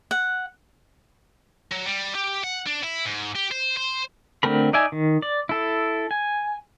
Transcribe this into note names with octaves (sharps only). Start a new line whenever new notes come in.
F#5
F#3
G3
G4
F#5
D4
E4
G#2
G4
C5
C5
D3 A3 C4 A#4 B5
D#4 D5 E5 G#5
D#3
D5
E4 A4
G#5